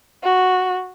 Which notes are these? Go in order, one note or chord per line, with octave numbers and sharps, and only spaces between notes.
F#4